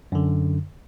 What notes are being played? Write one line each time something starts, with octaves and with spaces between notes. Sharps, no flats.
F#2 D3